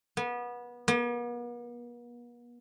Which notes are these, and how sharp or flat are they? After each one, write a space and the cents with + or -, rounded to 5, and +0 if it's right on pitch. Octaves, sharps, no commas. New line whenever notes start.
B3 -25
B3 -45